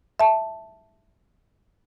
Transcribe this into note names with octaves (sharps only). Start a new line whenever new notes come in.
E5 A5